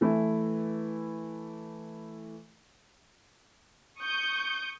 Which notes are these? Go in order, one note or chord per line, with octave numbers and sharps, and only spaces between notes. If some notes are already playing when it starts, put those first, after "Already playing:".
E3 A3 E4
C#6 D#6 G6